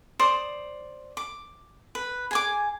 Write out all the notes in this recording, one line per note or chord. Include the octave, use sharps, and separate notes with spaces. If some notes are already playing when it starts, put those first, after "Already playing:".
C5 D5 D#6
D6
B4
G#4 G#5 D6